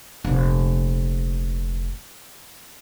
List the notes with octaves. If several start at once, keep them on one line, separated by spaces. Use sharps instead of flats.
F1 A#2